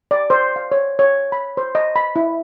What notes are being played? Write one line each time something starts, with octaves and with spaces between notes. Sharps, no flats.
D5
C5
F5
C#5
C#5
B5
C5
D#5
B5
E4